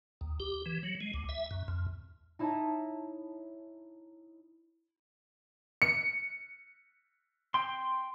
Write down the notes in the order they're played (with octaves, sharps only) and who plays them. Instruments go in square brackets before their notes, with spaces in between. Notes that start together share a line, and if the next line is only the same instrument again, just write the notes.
[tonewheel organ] D#2
G4
E3
F#3
G#3
D2
E5
F#2
F2
[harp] D#4 E4 C#5 D#5 A5 A#5
[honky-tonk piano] C#7
[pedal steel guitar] G5 C6